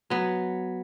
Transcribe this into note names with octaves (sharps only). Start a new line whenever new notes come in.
F#3 B3